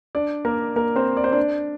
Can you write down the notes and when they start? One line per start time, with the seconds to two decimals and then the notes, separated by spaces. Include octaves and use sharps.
0.15 D4 D5
0.45 A#3 A#4
0.76 A#3 A#4
0.96 C4 C5
1.17 D5
1.24 C5
1.32 D4 D5